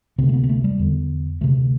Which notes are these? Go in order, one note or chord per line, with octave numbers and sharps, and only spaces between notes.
D2 C3 C4
A3
B3
B3
A3
G3
E2 D3
D2 C3 A3